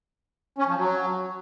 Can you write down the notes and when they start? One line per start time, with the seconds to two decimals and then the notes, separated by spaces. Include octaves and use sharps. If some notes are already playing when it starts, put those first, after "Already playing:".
0.58 C#4
0.67 F3
0.76 F#3